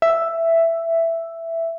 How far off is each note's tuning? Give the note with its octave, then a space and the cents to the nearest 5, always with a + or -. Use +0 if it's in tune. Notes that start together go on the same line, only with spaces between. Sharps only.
E5 +5